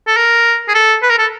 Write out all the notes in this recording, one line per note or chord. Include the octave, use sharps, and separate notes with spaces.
A4
A#4
G#4
A4
B4
A#4
A4